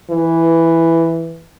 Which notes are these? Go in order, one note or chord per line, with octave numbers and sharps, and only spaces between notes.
E3